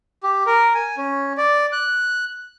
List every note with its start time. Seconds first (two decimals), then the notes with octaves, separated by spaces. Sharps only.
0.23 G4
0.46 A#4
0.74 G#5
0.98 C#4
1.37 D5
1.72 F#6